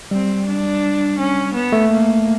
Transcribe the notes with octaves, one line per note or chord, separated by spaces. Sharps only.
G3 C4
D4
C#4
B3
A3
A#3